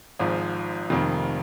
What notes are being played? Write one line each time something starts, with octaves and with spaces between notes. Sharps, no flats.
G#1 G#2 F3
F1 F2 D#3 A#3